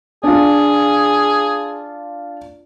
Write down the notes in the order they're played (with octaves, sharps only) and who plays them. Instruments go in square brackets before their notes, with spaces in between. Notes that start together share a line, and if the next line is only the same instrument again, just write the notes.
[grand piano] D4 F4 [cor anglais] G#4